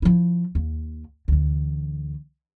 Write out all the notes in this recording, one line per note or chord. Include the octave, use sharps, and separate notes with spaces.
F3 E4
D#2
D2 E3